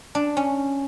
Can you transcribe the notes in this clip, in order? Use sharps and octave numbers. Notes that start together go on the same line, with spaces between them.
D4
C#4